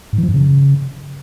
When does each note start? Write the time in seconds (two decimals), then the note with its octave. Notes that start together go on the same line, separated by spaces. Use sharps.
0.13 G#2
0.18 E3
0.23 F3
0.29 G2
0.34 C#3